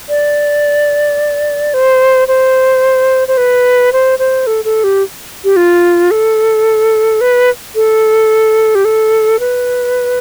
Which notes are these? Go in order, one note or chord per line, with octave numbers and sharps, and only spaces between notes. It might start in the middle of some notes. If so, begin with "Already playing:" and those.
D5
C5
C5
C5
B4
C5
C5
A4
A4
G4
G4
F4
A4
B4
A4
G4
A4
B4